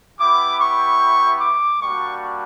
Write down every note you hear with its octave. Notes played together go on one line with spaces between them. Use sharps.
B3 E4 G4 D6
C#6
D6
G3 A#3 D4 F#4 C#6